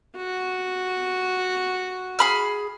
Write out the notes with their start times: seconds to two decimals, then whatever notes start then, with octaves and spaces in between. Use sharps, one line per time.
0.16 F#4
2.19 G#4 B5 F6